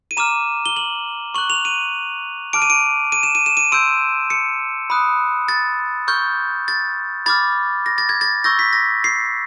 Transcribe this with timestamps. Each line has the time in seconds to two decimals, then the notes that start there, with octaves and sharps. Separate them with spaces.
0.11 D#7
0.17 A#5 D6 F6 E7
0.66 G7
0.76 F#7
1.35 C#6 F#6 F#7
1.50 F7
1.65 D#7
2.53 A5 D6 F6 D7
2.62 D#7
2.70 D7
3.12 D#7
3.23 E7
3.35 D#7
3.46 E7
3.57 D#7
3.72 C6 E6 G6 D7
4.30 C#7
4.90 B5 D#6 F#6
5.49 A6
6.08 C#6 F6 G6
6.68 A6
7.26 B5 D6 F6 A6
7.86 A#6
7.98 A6
8.09 G#6
8.21 A6
8.44 C#6 E6 G6 A#6
8.59 B6
8.73 A#6
9.04 C7